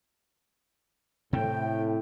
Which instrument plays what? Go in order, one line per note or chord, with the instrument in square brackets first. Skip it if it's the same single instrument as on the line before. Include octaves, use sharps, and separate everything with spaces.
[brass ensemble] A2 [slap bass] C3 C4 [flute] G5